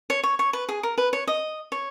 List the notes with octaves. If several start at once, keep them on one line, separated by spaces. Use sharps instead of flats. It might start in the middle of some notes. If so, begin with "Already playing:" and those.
C#5
C#5
C#5
B4
G#4
A#4
B4
C#5
D#5
C#5